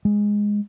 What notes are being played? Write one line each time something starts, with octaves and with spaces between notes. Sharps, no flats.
G#3